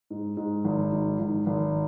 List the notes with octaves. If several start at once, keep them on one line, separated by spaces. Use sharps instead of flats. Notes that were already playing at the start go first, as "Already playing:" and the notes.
G#2
G#2
G#1
G#2
G#1
G#1